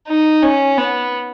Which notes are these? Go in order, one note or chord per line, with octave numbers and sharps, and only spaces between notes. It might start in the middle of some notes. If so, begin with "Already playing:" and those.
D#4
C#4
B3